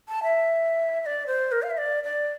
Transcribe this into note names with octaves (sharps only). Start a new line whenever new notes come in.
A5
E5
E5
D5
C5
A#4
F5
E5
D5
D5